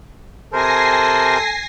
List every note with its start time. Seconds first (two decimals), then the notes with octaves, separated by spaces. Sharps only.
0.53 C3 A4 A#4 C5 G#5 A#6 C7